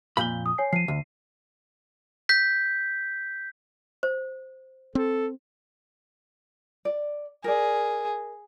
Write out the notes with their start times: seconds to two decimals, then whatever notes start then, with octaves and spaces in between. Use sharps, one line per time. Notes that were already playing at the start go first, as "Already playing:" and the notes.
0.17 F2 A#2 F5 B5 G6 G7
0.46 D#6
0.58 C#5 G#5 C7
0.73 F3 C7 D#7
0.88 D2
2.29 G6 B6
4.03 C5
4.95 C4 A4
6.85 D5
7.44 G#4 A#4 D5